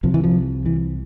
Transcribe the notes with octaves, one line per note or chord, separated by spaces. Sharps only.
C2 C3 F3
E3
F3
E3